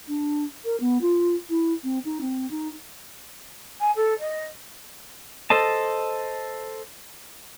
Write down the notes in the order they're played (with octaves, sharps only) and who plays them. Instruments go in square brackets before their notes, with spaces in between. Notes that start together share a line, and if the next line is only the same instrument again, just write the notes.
[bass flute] D4
A#4
B3
F4
E4
C4
D#4
C4
D#4
[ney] G#5
A4
D#5
[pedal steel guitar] A4 C5 D#5 A5